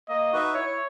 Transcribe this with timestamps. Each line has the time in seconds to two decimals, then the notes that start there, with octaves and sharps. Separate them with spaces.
0.09 A#3 D#5
0.32 D#4 F#4 B4 E5
0.54 E4 C#5